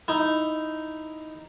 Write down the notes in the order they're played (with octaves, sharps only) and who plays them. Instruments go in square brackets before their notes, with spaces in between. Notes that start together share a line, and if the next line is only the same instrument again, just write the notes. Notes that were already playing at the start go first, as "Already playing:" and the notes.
[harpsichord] D#4 E4